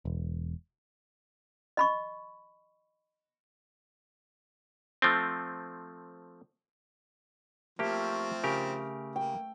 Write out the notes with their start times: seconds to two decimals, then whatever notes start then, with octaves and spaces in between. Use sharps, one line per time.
0.05 E1
1.77 D#5 B5 C#6
5.02 F3 A3 C4
7.79 F3 A3 A#3 C4 G4
8.44 C#3 G4 A#4
9.16 A#3 G5